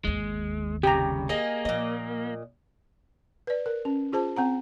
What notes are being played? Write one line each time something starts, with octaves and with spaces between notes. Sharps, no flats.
G1 D#2 G#3
C2 C#3 G4 A#5
A#3 G#4 D#5
A#2 F3 D#5
B4 D5
A#4
C#4
F4 G#4 C5 A5
C4 F#5 A#5